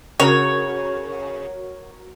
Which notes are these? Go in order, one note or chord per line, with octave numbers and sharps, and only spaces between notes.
C#3 F#4 A#4 C#5